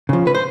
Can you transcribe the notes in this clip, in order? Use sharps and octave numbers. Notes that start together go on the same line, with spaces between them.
C#3 F3
B4
C5